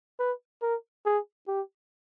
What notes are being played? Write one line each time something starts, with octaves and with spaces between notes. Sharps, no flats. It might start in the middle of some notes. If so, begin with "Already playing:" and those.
B4
A#4
G#4
G4